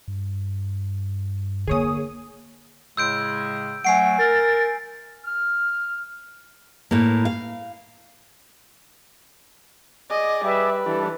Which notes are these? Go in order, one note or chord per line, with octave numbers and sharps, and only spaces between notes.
G2
D3 A#3 G#4 C#5 D#6
A2 C#3 G#3 E6 G6 D7
F#3 A3 F#5 G#5 C7 D7
A#4 A6
F6
A2 A#3
F5
G#4 D5 D#5
G3 B4 E5
E3 G3 D4 A4